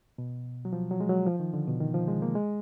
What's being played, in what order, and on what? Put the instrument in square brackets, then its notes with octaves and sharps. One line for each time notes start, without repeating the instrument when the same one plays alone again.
[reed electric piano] B2
F#3
F3
F#3
G#3
F#3
F3
D#3
D3
B2
D#3
F3
G#3
A#3
G#3